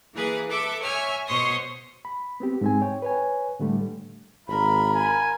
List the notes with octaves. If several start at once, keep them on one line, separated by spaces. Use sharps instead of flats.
E3 A#3 G#4 B4
A4 B4 E5 D6
C#5 E5 G#5 F6
B2 C5 C#5 C6 C#6 D#6
B5
B3 C4 G4
G#2 C4 G#5
C#5 G5
B4 C#5 G#5
A2 D3 G3 A3
G#1 F4 A#4 B5
G#5